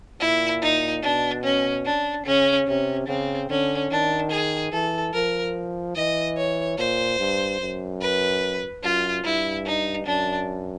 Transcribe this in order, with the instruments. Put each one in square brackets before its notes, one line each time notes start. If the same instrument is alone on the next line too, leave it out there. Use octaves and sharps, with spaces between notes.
[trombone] A#2 [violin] E4
[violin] D#4
[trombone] B2 [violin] D4
[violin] C#4
D4
[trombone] C#3 [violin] C#4
[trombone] C3 [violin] C#4
[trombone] C#3 [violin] C4
[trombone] D3 [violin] C#4
[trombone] D#3 [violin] D4
[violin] G#4
[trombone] E3 [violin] A4
[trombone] F3 [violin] A#4
[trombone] E3 [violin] D#5
[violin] C#5
[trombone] A#2 [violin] C5
[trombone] G2
F#2
[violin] B4
[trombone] F#2 [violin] F4
[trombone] G2 [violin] E4
[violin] D#4
[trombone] F#2 [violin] D4